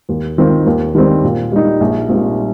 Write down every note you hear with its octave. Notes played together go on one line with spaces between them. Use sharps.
D#2
D#3 C4 F4
D#2
D#3 G3 C4
A#2
G3 D#4
A#1
A#2 G3 C4 D#4